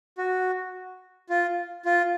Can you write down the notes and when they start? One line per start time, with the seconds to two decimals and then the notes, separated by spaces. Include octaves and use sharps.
0.18 F#4
1.30 F4
1.85 F4